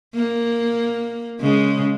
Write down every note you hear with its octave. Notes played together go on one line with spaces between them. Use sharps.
A#3
C#3 G#3